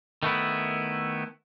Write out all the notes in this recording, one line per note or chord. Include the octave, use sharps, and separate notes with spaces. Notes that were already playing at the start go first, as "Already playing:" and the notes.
D#3 A3 B3 E4